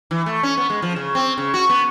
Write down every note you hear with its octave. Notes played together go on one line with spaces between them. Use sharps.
E3
A3
C#4
B3
G#3
F3
C#3
C4
C#3
F#4
B3